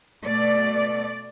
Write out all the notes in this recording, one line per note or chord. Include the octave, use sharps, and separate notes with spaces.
B2 A3 D5